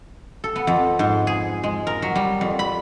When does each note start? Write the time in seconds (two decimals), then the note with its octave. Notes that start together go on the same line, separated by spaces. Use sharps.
0.44 A4
0.56 B3
0.67 F2
0.99 G#2
1.27 G#4
1.63 G#3
1.87 A#4
2.02 F#3
2.15 G3
2.41 F2
2.59 B5